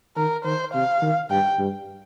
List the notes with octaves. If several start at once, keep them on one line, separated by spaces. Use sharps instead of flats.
D#3 A#4
D#3 C5
C3 F5
D#3
G2 G5
G2